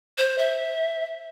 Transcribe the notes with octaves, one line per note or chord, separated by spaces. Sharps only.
C5
E5